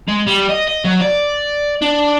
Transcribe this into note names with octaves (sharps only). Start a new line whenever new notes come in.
G#3
G3
D#5
D#5
F#3
D5
D4